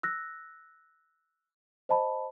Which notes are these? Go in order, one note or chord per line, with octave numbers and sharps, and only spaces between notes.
E6 F#6 A#6
C5 D#5 A5 B5